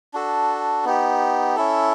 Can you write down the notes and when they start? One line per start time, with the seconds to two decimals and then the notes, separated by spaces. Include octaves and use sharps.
0.14 D4 F#4 A4
0.85 B3 D#4 G4
1.56 C#4 E4 A4